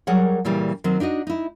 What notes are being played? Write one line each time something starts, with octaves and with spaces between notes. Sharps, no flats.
F#3 G3 G#4 A#4 C#5 F#5
A#2 C#3 E3 G3
D#3 F#3 C4
D4 D#4 F#4 D#5
D#4 E4